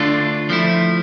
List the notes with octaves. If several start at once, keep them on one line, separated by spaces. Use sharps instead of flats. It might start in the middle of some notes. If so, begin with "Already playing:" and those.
Already playing: D3 A3 D4 F4
F3 A3 E4